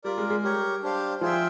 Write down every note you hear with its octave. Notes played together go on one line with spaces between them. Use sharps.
G3 F4 A#4 D5
G#3
G#3
G3 G4 A#4 C#5
D4 G4 C5 F5
F3 F4 G#4 C5 E5 G5